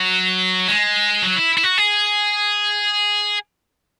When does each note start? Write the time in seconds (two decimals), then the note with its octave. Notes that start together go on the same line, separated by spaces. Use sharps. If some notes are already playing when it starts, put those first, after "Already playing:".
Already playing: F#3
0.68 G#3
1.23 F#3
1.36 E4
1.58 E4
1.64 F#4
1.78 G#4